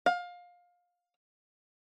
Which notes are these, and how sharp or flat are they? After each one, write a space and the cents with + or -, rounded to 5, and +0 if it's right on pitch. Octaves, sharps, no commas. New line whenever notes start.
F5 +20